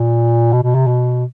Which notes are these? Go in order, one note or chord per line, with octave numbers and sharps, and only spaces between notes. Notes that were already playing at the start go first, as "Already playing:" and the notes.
Already playing: A#2
B2
B2
C3
B2